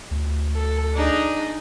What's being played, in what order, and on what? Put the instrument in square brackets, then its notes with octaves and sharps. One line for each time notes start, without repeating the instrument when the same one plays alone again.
[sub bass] D2
[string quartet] A4
D4 D#4 G#4